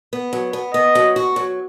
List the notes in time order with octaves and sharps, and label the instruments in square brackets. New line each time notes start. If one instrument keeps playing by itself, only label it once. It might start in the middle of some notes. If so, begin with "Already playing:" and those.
[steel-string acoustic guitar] B3
F#3
B3
[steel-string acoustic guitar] B3 [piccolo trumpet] D#5
[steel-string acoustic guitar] F#3
F#4
F#3